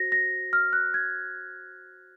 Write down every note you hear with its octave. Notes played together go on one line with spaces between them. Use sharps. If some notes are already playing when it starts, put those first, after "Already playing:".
Already playing: F#4 C5 A#6
A#6
F6
F#6
G#6